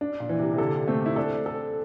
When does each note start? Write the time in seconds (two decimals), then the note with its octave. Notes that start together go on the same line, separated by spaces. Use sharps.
0.01 D4
0.20 A#2
0.29 E3
0.39 C3
0.53 C3
0.58 D3 A4
0.87 A3 C4
1.06 E4
1.16 D4 A4
1.46 A4